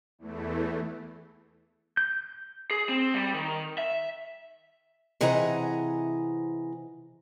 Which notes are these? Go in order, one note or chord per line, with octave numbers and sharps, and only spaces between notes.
E2 E3 A3
G6
G#4
C4
G3
D#3
E5
C3 E3 G#4 D#5 F#5 A#5